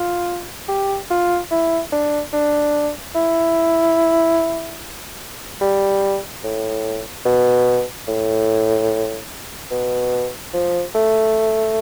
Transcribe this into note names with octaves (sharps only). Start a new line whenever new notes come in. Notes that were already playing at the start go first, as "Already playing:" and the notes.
Already playing: F4
G4
F4
E4
D4
D4
E4
G3
A2
B2
A2
B2
F3
A3